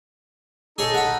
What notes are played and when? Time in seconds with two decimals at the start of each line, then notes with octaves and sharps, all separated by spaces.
0.78 D#4 G#4 A4 C#5
0.94 F#5 B5